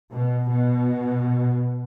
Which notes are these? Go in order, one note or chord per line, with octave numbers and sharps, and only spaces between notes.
B2
B2